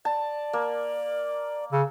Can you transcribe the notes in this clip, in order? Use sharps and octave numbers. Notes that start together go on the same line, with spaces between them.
D5 A5
A#3
C#3 E6